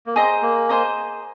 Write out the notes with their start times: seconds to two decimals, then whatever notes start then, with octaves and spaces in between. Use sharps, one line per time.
0.06 A#3
0.15 C4 G#4 C5 D#5 A#5
0.42 A#3
0.69 G#4 C5 D#5 A#5